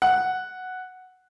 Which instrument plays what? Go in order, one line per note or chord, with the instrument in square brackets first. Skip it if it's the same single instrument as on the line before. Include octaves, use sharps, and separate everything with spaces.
[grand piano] F#5